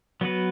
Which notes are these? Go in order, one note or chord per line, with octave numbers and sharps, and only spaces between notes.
F#3 B3 F#4 B4